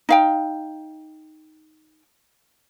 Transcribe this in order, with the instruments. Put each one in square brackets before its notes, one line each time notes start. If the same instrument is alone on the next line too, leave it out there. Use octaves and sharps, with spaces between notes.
[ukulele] D#4 F5 G5